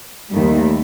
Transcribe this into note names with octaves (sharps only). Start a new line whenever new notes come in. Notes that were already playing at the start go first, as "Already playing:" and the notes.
D#2 D#3 G3 A3